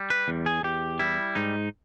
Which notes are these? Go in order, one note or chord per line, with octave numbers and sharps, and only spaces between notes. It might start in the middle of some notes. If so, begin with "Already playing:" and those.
Already playing: G3
B4
E2
G#4
E2 G4
G3 E4
G#2 D#4